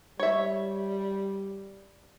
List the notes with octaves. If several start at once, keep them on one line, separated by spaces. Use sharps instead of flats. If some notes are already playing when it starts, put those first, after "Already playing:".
G3 C#5 E5